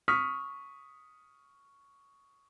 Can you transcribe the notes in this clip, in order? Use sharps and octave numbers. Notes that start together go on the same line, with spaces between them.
C#6 D#6 F6 B6